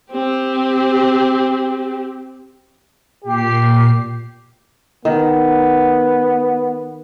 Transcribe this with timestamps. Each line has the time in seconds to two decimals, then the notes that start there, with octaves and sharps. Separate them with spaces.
0.12 C4 G4
3.24 A#2 G4 C7
5.05 D#3 B3